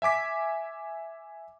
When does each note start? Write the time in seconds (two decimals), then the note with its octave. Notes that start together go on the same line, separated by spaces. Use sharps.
0.02 E5 G#5 D6 B6